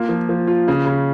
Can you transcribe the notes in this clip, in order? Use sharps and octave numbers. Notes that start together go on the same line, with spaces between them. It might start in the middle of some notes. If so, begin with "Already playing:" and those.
Already playing: A#3 F4
F3
F3
F4
C#3
C#3